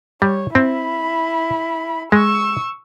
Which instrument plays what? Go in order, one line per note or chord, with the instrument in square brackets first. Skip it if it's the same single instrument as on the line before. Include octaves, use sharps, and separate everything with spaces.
[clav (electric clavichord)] G3 [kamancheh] C#5
[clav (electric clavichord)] C4 [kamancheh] E4 B5
[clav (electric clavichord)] G#3 [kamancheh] C#6 E6